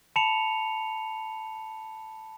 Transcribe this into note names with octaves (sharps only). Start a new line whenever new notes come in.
A5 B5 C#7 F7